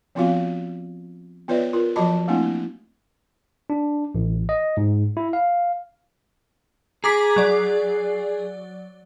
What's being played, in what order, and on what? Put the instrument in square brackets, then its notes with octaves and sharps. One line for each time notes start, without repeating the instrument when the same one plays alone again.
[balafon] F3 B3 C4 F4 F#4 F5
B3 F4 B4 C#5 D5 E5
F4 A#4
F3 F#3 F#4 D#5 A5 B5
A3 A#3 C4 D4 E4
[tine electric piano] D4
A1
D#5
G#2
E4
F5
[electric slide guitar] G#4 [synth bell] A#5 D6 B6
[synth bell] F#3 D5